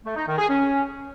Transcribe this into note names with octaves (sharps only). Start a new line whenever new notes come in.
A3
D#4
D#3
G#4
C#4